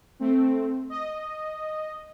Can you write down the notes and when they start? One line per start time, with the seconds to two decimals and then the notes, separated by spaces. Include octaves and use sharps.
0.20 A3 C4
0.89 D#5